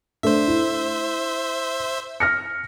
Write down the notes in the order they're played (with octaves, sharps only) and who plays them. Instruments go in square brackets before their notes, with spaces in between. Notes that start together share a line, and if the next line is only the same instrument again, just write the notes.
[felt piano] A3 D4 [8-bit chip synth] C5 E5
[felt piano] E4
F6 A#6 C#7